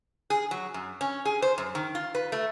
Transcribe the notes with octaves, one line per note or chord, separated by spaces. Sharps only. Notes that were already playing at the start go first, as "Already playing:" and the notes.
G#4
F#3
F#2
C#4
G#4
C5
F#2
D#3
F4
B4
A3